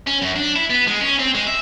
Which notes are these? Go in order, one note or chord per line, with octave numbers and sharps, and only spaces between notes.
C#4
F#2
D4
E4
B3
G#3
C#4
C4
G#3
E5